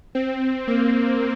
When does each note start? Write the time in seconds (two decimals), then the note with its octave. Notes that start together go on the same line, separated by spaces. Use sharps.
0.15 C4
0.67 A#3